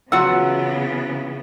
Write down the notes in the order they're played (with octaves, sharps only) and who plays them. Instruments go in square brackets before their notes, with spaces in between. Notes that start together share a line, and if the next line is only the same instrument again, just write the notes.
[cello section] C#3 E3 B3 [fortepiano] F#3 E6 [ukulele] F4 F#4 F#5